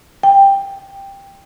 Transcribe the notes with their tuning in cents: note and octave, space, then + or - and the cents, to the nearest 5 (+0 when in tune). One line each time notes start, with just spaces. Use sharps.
G5 +10